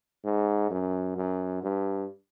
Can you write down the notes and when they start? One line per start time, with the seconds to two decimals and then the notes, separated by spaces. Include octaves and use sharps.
0.24 G#2
0.71 F#2
1.17 F#2
1.63 G2